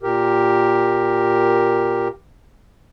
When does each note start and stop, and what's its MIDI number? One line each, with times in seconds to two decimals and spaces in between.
0.03 2.08 46
0.03 2.08 67
0.03 2.08 70